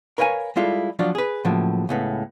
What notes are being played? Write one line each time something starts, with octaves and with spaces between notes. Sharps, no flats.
A#4 B4 C#5 F5 F#5 G#5
G3 G#3 E4 F4 A4
F3 F#3 D4 F4 D5
G#4 B4
A2 C#3 F3 F#3 A#3
C#2 A2 B3